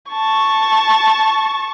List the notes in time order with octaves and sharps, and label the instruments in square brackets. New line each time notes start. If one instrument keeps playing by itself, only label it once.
[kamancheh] A5 C#6